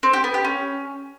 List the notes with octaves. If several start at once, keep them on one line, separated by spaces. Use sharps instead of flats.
C4
G4
B3
G4
C#4